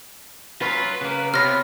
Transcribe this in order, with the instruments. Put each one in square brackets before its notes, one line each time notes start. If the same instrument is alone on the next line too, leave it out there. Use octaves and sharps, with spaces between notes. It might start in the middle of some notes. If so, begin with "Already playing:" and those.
[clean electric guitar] F#3 C#4 F4 [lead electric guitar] B4
[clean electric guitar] C#3 A#3
[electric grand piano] C3 C#5 B5 [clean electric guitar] B3 F4 [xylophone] F6 A#6